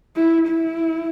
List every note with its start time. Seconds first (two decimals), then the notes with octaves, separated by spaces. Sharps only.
0.17 E4
0.48 E4